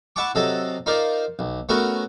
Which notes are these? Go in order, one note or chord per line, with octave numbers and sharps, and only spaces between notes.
E4 E5 F#5 A5 C#6 D6
C3 F#3 A4 D#5 A5
D#4 F4 A#4 C5 D5
B1
A3 B3 C#4 F#4 A#4